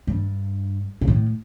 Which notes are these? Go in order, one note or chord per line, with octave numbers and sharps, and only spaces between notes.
G2
A#2
A2